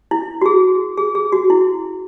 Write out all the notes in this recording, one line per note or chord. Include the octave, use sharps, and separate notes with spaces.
E4
F#4
G#4
G#4
G#4
F#4
E4